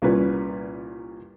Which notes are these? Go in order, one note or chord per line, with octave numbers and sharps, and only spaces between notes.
C2 A#2 C#4 B4